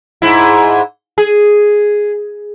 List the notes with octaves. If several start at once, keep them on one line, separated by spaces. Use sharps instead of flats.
G#2 E4
G#4